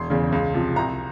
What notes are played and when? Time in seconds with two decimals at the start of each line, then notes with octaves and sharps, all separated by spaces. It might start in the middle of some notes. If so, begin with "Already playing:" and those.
Already playing: E1 C6
0.10 E2 C#3
0.32 C#2
0.54 C3 F3
0.76 C2 A#5